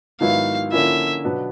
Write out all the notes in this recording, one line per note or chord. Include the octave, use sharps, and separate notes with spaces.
G#2 D#3 F#3 B3 E4 F5
D3 F3 A#3 C#4 E4 E5
B2 F#3 B3 D4